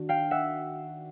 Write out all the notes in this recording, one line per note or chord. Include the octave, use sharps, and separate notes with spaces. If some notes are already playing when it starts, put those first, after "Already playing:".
Already playing: D#3 D4 F#4
F5 G5
E5 F#5